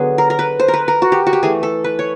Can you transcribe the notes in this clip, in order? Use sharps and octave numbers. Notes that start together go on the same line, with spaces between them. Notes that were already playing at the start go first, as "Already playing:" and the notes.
Already playing: D3 F#3 B3 G#4
A#4
A#4
B4
C5
A#4
B4
A#4
F#4
G4
F#4
G4
E3 A3 G#4
A4
B4
C#5